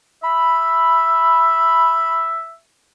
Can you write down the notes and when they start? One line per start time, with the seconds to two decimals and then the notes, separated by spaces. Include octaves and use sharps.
0.23 E5 B5